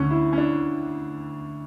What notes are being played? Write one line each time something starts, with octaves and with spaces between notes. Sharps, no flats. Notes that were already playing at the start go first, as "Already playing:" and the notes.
Already playing: D2 D3 C#4
E4
C#4
D4